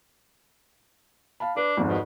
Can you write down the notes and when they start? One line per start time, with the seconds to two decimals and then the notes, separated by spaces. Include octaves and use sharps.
1.40 F5 A5 B5
1.57 D4 B4
1.77 G#1 F2 G#2
1.89 B2